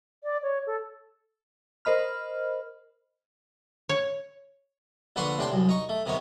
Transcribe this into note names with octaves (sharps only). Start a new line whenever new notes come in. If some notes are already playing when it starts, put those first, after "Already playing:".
D5
C#5
A4
A#4 C5 D#5 B5 F6
C#5
A#1 D3 B4 F#5 C6 C#6
A2 C3 D4 G5 C6
C2 F#2
D#4 C#6
A3
C3 D#3 B3 C#5